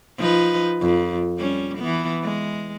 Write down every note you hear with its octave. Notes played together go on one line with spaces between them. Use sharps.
F3 D#4 B4
F2
G3 C#4
E3 B3
G#3